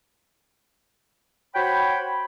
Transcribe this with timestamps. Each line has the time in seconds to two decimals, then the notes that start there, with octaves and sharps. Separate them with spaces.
1.55 F#4 C5 C#5 G5 B5